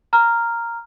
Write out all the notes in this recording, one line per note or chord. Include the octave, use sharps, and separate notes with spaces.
A#5 F6